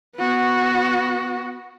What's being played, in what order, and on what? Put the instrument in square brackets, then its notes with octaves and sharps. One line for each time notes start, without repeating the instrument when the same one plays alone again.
[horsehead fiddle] B3 F#4